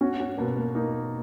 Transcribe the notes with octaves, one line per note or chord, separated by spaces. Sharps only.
C#4 F#4
C#4
B2 A#3
A#3
A#3 D#4